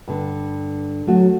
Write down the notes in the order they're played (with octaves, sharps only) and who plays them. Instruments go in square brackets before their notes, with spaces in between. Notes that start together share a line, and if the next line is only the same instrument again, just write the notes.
[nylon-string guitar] G2 D3
[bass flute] F#3 [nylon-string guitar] A3 F#4